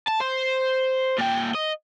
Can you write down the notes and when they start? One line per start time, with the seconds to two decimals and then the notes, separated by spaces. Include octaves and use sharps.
0.08 A5
0.21 C5
1.18 A#2 G5
1.54 D#5